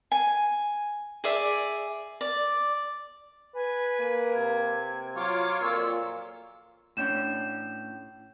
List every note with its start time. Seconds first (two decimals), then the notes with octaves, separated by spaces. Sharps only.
0.12 G#5
1.24 G#4 D5 E5
2.21 D5
3.55 B4 G#5
4.00 A#3
4.35 C3 G#6
5.16 F#3 F4 C#5 D6
5.61 F2 A#2 E6
6.97 A2 C#4 D4 G6 E7